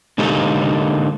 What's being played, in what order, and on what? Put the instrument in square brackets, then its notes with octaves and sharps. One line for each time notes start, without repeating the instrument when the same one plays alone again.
[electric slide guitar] D3 G#3 A#3 D#4 G4 A4